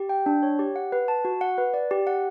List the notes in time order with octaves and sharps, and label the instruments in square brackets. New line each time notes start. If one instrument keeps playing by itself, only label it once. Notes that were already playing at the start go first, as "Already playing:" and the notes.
Already playing: [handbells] G4
G5
D4
C#5
G4
F#5
B4
A5
F#4
F#5
B4
D5
G4
F#5